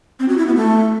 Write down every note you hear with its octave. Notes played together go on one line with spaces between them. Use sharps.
C4
F#4
E4
B3
A3